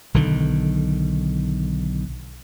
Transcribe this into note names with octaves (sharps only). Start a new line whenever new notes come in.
B1 D3 D#3